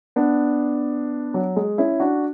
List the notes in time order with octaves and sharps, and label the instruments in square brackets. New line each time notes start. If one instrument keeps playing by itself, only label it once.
[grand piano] B3 D4
F#3
G#3
C#4 E4
D4 F#4